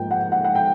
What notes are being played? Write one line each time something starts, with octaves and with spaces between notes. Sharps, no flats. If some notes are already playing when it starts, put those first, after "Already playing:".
Already playing: G#2 F3 A#3 G5
F#5
F#5
F#5
G5